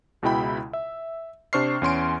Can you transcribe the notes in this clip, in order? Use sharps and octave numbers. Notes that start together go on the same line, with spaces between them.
C#2 B2 G#3 E4 G5 B5
E5
C3 D4 C5 C#6 F6 C7
E2 C#4 C6 D7